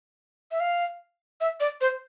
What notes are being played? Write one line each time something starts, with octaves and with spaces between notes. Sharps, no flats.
E5
F5
E5
D5
C5